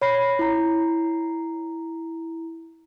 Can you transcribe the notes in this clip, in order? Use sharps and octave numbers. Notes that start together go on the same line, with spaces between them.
C#5 B5 A#6 C7
E4 A#5